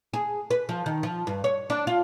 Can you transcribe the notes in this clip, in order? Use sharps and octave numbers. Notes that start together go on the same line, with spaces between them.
G#4
B4
F3
D#3
F3
G2
C#5
D4
F4